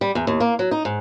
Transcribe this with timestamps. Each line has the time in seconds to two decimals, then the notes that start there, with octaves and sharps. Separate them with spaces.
0.01 G3
0.15 E2
0.27 D#2
0.40 A#3
0.59 F#3
0.71 D#4
0.85 G#2